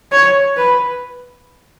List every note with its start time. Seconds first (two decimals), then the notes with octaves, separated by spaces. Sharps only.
0.12 C#5
0.57 B4